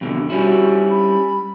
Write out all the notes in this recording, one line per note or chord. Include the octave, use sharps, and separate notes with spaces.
F2 B2 D3
G3 C#4 E4 F#4
B5